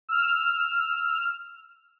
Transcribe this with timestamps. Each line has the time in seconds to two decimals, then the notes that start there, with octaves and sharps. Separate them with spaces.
0.09 E6 F6